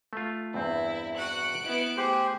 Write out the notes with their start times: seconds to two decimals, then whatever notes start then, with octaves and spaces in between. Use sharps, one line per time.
0.13 A3 F4
0.54 E2 G2 C4 E4
1.17 F#4 F#5 F#6 D7
1.63 B3 E4
1.97 A3 G4 G#4 C5